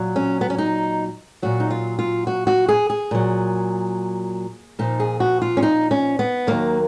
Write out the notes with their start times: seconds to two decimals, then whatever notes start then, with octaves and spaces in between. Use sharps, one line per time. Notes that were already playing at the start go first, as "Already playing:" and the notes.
Already playing: A#2 F#3
0.16 C#4
0.41 B3
0.50 C#4
0.58 D#4
1.42 A#2 F#3 F#4
1.60 D#4
1.70 F4
1.99 F4
2.27 F#4
2.47 F#4
2.68 G#4
2.90 G#4
3.11 A#2 F#3
4.79 A#2 F3 D#4
5.00 G#4
5.20 F#4
5.42 F4
5.57 C#4
5.63 D#4
5.91 C#4
6.19 B3
6.47 D#2 D#3 F#3 A#3